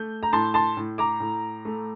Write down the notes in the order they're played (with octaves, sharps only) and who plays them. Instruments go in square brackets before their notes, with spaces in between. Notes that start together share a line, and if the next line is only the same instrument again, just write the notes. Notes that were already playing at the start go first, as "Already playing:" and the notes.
Already playing: [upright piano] A3 G6
A#5
A2 A5 C6
A5 C6
A2
A#5 D6
A2
A3